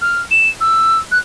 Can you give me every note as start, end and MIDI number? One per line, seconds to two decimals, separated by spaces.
0.02 0.21 89
0.31 0.49 100
0.61 0.99 88
1.12 1.19 90